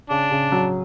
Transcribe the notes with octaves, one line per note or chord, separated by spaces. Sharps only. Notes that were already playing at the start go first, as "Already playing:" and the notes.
C#3 D4
C#3
F#3